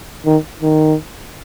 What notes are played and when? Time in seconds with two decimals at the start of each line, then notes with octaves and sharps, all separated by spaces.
0.26 D#3
0.62 D#3